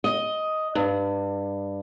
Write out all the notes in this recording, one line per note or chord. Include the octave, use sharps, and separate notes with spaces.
D#5
G2